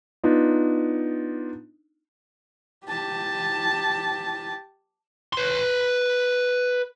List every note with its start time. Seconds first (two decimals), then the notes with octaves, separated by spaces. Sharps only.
0.23 B3 D4 D#4 F4
2.87 G4 A5
5.33 B4 C6